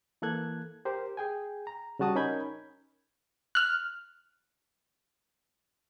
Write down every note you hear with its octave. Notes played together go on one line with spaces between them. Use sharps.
E3 A#3 A4 F#6 G#6
G4 A#4 C5
G#4 G5 G#5
A#5
C#3 G3 F#4 A5 D#6
C#4 D#4 A#4 B5 G6 G#6
F6 F#6